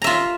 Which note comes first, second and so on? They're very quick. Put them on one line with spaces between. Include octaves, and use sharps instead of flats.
A#5 E5 F4